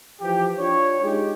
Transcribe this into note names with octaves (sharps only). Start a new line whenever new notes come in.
E3 F3 G4
D4 F4 C#5
G#3 D#4 G4